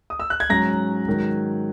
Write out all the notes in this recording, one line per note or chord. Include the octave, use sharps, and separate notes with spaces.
D#6
E6
F#6
G#6
G#2 F#3 C#4 A#5 A#6
G#2 D#3 F#3